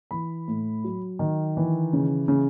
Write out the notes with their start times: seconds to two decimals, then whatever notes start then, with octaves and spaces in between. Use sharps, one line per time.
0.11 E3 B5
0.48 A2
0.84 F#3
1.19 D#3
1.57 E3
1.93 C#3
2.28 C#3